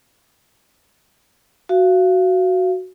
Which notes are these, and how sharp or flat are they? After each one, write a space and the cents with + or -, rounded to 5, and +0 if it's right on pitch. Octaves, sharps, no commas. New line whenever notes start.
F#4 +0 F5 -30